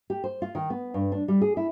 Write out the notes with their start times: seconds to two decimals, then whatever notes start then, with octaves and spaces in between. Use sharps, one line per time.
0.10 G4
0.24 C5
0.42 F4
0.55 D#3
0.70 B3
0.94 G2
1.12 D4
1.28 G3
1.41 G#4
1.57 E4